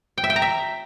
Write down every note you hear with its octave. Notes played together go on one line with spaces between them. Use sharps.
G5
E5
G5
A#5
E5